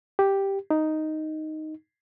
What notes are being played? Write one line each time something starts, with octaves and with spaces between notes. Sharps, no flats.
G4
D#4